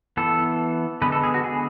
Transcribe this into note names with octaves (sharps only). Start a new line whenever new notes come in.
E3 B3 A4
D3 G#3 B3 B4
A4
G#4
F#4
G#4